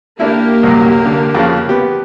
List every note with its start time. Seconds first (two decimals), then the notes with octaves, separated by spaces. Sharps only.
0.20 A#3 D4 E4 G4
0.63 C2 F#2
1.06 D3
1.35 F2 C#3 F3
1.69 B3 G4